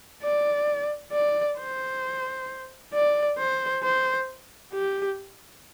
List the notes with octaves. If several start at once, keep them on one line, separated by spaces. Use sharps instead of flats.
D5
D5
C5
D5
C5
C5
G4